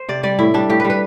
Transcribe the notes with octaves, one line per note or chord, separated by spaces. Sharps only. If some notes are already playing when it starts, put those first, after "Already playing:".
Already playing: C5
C3 D5
G3 D5
A2 E4
G3 D4
A2 G4
B4
G3
B4